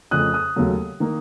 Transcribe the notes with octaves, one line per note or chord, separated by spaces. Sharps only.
F2 C#3 A3 D#6 F#6
D#6 F#6
D#2 C#3 F#3 A3
D#3 A#3